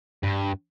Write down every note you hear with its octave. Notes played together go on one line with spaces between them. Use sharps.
G2